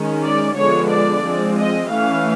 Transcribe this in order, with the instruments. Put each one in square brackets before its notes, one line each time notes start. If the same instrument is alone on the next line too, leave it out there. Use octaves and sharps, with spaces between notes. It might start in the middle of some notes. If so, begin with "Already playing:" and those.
Already playing: [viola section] D#3 G#3 C#4
D5
D3 F3 G#3 B3 D4 C#5
D5
F3 G#3 C4
D#5
E3 A3 C#4 F5